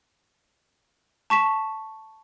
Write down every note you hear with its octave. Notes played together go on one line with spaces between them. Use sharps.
A5 C#6 B6 E7